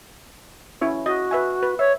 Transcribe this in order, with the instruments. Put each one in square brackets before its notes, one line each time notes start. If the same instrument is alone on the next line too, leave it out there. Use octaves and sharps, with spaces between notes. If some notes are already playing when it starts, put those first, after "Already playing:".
[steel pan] C#4 E4 C#5
[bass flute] F#4 [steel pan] D#5
[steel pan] B4 E5 G#5
B4
[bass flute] C#5 [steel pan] E5